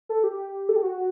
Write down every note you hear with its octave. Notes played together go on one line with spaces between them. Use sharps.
A4
G4
A4
G4
F#4